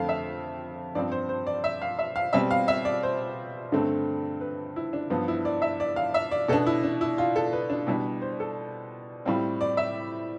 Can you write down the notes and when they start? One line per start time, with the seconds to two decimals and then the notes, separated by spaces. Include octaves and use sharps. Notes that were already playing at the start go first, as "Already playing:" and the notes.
Already playing: F2 D3 A3 C4 F5
0.09 E5
0.95 G2 F3 C4 D5
1.12 C5
1.29 C5
1.47 D5
1.64 E5
1.82 F5
1.99 E5
2.16 F5
2.33 B2 G3 C4 E5
2.51 F5
2.68 E5
2.85 D5
3.03 C5
3.72 G2 D3 A3 C4
4.41 B4
4.76 E4
4.93 D4
5.10 G2 F3 B3
5.28 E4
5.45 D5
5.62 E5
5.80 D5
5.96 F5
6.14 E5
6.31 D5
6.48 B2 B3 D4 A4
6.67 E4
6.83 D4
7.01 E4
7.18 F4
7.36 A4
7.53 B4
7.70 D4
7.87 B2 G3 D4 E4
8.21 C5
8.40 A4
9.25 A2 G3 C4 F4
9.61 D5
9.77 E5